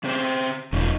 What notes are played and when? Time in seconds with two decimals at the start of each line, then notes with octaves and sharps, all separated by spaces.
0.04 C#3 C4 C5
0.73 E1 C#3 F3 D#4